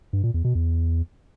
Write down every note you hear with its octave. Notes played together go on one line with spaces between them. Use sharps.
G2
A#2
E2
B2
E2